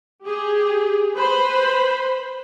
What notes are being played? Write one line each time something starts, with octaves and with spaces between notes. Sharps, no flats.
G4 G#4
B4 C5 B5